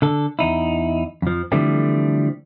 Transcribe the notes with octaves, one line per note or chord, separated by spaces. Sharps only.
D3 A4
E2 D#4 E4
F2 F3
D3 E3 F3 G3 A3 C4